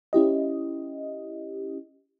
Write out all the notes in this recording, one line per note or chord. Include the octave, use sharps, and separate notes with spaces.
C#4 E4 G4 D#5